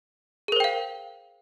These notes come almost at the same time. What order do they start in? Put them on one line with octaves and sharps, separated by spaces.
G#4 A#4 C5 G5 F5